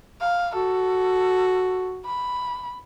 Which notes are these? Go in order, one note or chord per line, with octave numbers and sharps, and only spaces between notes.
F5
F#4 A4
B5